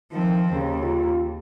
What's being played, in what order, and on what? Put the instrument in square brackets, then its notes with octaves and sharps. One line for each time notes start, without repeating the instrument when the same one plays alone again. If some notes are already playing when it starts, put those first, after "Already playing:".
[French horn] D#3 [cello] F3 C4
[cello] D#2 [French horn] C#3
[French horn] F4